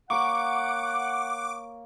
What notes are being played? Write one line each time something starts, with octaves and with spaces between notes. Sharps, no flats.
A#3 C#5 F#5 C#6 D6